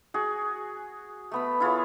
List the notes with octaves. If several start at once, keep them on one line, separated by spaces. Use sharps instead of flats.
F#4 G#4
A3 B3 B5
E4 F4 G#4 C#5